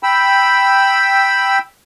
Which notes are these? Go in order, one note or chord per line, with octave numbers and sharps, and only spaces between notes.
G5 B5 E6